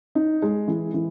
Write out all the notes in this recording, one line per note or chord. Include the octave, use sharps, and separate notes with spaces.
D#4
G#3
E3
E3